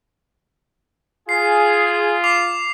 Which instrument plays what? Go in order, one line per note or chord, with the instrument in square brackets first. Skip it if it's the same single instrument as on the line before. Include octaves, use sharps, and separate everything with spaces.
[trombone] F4 [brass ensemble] G#4 [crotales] C7
[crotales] D6 C7 F7